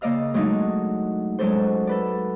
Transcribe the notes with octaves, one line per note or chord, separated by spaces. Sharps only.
C#3 A#3 D5 D#5 F5 E6
F#3 G#3 A3 D4 D#4
F#3 G#3 C#4 A4 C5
A4 B4 D5